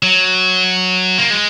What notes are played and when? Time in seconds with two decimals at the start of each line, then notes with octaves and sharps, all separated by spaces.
0.03 F#3
1.18 A#3
1.30 G#3